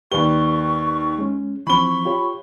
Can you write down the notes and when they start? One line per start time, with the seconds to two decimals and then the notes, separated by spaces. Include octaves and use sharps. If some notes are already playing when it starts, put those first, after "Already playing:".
0.12 D#2 G4 B4 D5 C#6 G7
1.19 G#3 C#4
1.67 E3 F3 C4 B5 C#6 G7
2.05 F4 G4 C#5